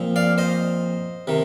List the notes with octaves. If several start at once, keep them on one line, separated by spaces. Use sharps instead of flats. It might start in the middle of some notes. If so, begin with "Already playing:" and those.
Already playing: A#2 F3 C4
D5 F5
C5 D#5
C3 D#3